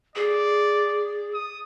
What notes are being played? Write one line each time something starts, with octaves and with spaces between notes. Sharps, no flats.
G#4 D5
D#6